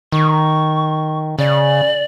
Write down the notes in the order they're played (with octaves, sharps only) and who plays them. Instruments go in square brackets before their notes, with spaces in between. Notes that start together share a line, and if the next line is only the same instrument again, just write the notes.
[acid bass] D#3 [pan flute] C#6
[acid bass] C#3 [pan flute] D5